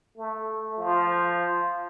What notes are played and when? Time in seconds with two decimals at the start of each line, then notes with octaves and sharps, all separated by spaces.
0.17 A3
0.78 F3